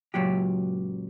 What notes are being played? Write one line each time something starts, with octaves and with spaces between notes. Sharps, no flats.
C#2 F#2 A#2 F#3 G4